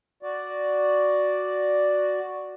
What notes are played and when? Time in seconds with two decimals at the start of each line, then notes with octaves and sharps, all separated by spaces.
0.23 F#4 D5